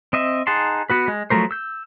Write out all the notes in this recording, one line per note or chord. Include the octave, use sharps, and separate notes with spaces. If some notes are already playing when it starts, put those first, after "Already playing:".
C4 D#5 E5
D#4 G#4 F#5 A5 C6
B3 F#4 B4
G#3
F3 F#3 A3 A#4 C5
E6 G6